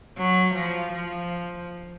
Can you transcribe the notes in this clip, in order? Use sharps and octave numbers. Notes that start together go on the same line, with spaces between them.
F#3
F3
F3